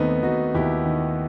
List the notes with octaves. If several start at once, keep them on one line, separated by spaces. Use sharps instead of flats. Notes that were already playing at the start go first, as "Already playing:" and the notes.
Already playing: D#2 D#3 A3 B3 C4 D#4
D#2 D#4 F#4
D#2 E4 G4
D#3